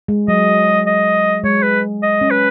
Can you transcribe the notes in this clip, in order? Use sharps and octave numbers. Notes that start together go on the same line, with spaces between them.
G#3
F#3 D#5
D#5
G#3 C#5
B4
D#5
C#4
B4